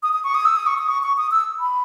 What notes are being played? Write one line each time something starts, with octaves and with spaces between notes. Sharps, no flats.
D#6
D#6
C#6
D#6
E6
D#6
C#6
D#6
C#6
C#6
D#6
E6
B5